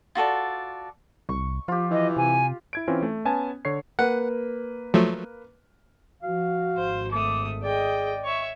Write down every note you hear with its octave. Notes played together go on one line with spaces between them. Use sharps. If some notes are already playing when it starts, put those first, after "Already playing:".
F4 F#4 A4 D5
C2 C#6
F3 F4 G4
E3 D#5
C3 G#5
E4 G#6 D7
E3 C4 C#4 F4
A3
B3 C#4 G#5 A5
D3 C#5 C7
A#3 B4 F#5
F3 F#3 A3
F3 F#4 F5
G#1 C5
A3 D6 D#6
G#4 D5 D#5 G5
C#5 E5 C#6